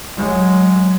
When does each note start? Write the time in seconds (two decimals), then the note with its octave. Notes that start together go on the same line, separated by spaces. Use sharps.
0.16 F#3 G#3